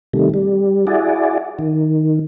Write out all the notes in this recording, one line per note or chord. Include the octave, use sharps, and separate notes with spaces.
C3 D#3 G3 A3
G3
E4 F#4 G#4 D5
D#3